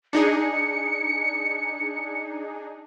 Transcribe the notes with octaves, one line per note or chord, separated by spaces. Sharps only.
D4 D#4 G#4 C#7